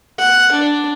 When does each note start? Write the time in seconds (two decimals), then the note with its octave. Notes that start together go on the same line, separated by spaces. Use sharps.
0.18 F#5
0.52 D4